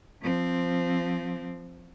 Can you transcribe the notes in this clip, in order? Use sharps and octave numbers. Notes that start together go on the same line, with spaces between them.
F3 C4